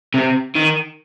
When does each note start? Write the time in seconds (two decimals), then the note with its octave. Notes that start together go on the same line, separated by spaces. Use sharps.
0.14 C3
0.56 D#3